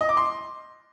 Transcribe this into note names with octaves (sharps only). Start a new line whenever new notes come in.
D#5
D6
C6